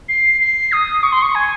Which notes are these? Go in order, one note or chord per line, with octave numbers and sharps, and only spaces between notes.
C7
C7
D#6
C#6
C6
C#6
G#5